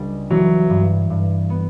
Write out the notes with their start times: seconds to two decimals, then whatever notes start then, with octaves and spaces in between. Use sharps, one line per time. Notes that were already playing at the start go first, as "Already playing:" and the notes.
Already playing: C#2 G3 D4
0.30 E3 F#3
0.70 G2
1.10 G2
1.50 B3